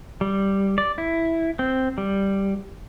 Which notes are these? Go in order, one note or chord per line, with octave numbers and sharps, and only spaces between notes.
G3
D5
E4
C4
G3